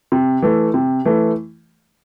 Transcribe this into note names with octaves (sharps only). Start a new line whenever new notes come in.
C3
E3 A3
C3
E3 A3